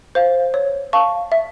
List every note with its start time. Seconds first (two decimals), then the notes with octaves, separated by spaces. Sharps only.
0.15 C5 F5
0.54 C#5
0.93 F5 A5 C#6
1.32 E5